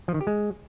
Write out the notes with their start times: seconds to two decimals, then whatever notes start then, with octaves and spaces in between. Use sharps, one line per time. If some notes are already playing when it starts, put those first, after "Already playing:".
0.08 F3
0.14 D#3
0.21 G4
0.27 G#3